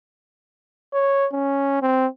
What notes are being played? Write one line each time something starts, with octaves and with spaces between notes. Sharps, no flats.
C#5
C#4
C4